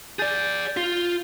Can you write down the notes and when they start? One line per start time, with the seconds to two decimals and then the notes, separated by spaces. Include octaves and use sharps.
0.19 G#4 D5 G6 A6
0.77 F4